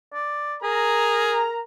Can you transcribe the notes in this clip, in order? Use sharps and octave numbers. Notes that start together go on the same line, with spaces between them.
D5
G#4 A#4 A#5